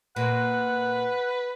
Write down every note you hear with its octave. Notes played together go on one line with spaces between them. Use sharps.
A#2 B4 F#5